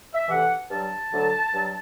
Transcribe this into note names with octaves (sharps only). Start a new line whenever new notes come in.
E5
D2 C3 E3 F#5
G2 F#3 A5
D2 D3 F#3
G2 F#3